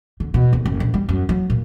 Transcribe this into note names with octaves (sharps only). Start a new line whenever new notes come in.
D3
B2
D#2
F#1
A#1
G3
F#2
F#3
A#2